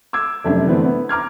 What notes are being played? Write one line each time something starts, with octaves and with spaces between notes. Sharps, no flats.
D6 E6 G#6
F1 F#2 D4 E5
D3 E3 A3 B3 C4
B3
A#5 D6 F6 G#6